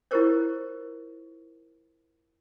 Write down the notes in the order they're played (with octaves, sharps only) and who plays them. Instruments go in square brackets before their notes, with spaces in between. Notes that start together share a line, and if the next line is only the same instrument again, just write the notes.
[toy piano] E4 F4 G4 A#4 C5 C#5